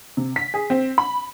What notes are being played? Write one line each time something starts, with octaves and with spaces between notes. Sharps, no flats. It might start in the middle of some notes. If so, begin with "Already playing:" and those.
C3
B6
G#4
C4
B5